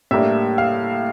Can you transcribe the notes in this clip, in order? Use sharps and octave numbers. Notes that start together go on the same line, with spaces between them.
A2 G3 A#3 D4 E5
F5